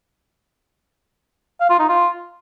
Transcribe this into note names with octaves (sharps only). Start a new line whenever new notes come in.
F5
F4
D#4
F4